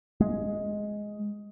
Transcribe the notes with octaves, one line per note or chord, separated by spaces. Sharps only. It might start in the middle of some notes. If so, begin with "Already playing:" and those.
G#3